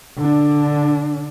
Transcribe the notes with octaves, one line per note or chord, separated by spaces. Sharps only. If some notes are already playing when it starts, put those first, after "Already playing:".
D3 D4